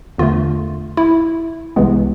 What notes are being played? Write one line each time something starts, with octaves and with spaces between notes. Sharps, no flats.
E2 D3 A3 F4
E4
C2 C3 E3 G#3 B3